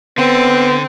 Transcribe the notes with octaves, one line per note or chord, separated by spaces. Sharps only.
D3 B3 C4